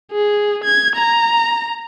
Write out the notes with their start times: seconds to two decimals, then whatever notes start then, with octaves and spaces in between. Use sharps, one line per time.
0.12 G#4
0.64 G#6
0.96 A#5